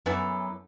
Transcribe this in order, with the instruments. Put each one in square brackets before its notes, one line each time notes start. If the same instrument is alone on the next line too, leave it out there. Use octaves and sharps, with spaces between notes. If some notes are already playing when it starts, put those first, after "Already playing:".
[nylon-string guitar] F#2 [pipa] E3 B3 E4 A4